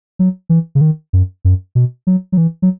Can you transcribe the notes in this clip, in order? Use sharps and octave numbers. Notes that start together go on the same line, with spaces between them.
F#3
E3
C#3
D#3
F#2
F#2
B2
F#3
F#3
E3
F#3